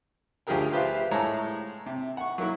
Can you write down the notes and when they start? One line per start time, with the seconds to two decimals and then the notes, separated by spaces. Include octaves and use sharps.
0.47 D2 F3 G4 G#4 A#4 G5
0.72 F4 G4 B4 C5 E5 F5
1.11 A2 G#3 A4 C#5 A#5
1.86 C3
2.17 F#5 C#6
2.38 F#3 A#3 E4